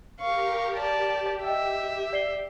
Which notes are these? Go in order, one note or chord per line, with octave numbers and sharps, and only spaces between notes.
G4 A#4 F5 C#6
G4 D5 A5
D#5 E5 G5 E6
D5 C7 G7